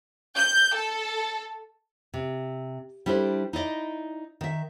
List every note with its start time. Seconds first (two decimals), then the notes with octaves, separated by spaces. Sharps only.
0.35 G6
0.74 A4
2.14 C3
3.06 G3 D4 E4 A4 C5
3.53 D#4 E4 D5 D#5
4.41 D#3 E5